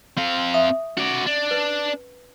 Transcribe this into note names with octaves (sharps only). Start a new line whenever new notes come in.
C4 F5
E5 C#6 D#6
C#4 F#4 D5
D4
B4